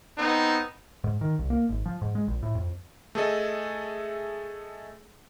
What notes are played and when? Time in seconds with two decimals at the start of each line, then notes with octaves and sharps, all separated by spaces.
0.18 B3 C4 D#4
1.04 G#2
1.21 D#3
1.39 C2
1.50 A#3
1.69 G#1
1.86 F3
2.02 G#2
2.15 G#3
2.27 A#1
2.43 A2
2.55 F2
3.15 A3 G#4 A4 D#5